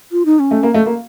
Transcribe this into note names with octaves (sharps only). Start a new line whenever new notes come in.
F4
D#4
C#4
A3
A#3
A3
A#3